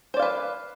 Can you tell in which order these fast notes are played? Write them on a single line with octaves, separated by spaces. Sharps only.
C5 D5 F5 B4